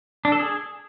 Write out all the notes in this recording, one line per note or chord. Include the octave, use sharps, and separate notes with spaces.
D4
A4
G#4